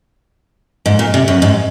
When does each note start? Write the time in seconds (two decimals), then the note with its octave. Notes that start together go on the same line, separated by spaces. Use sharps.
0.86 G#2
0.99 A#2
1.14 C3
1.28 F#2
1.42 G#2